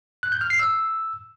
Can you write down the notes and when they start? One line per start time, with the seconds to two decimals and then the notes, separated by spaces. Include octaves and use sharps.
0.23 F#6
0.32 G6
0.41 F6
0.50 C7
0.59 E6